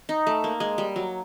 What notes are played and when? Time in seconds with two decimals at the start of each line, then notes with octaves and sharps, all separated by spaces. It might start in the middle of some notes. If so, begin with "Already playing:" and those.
0.09 D#4
0.27 A3
0.44 A#3
0.60 G#3
0.78 G3
0.96 F#3